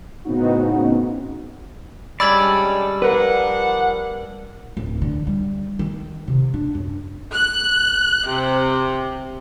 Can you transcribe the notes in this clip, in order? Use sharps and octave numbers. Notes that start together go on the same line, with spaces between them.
A2 C#3 B3 C4 D#4 F#4
G3 G#3 C#4 D4 D5 B5 E6 G#6
F3 D4 A#4 B4 F#5
D1
D3
G3
D#3
C3
D4
F#2
F#6
C3